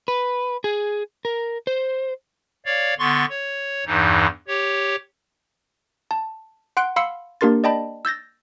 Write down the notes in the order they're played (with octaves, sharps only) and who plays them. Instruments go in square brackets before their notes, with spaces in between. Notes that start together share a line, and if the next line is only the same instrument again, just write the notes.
[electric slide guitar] B4
G#4
A#4
C5
[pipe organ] C#5 D5 F5
D3 B3 C6 C#6 A6
C#5
E2 G2 E3 D#4
G4 C#5
[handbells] A5
F#5 C6 F#6 D7
F5 B5 C6 E6 C#7
A#3 D4 G4 A#4 C6 A6
D5 D#5 G5 A5 B5
E6 G6 A6 A#6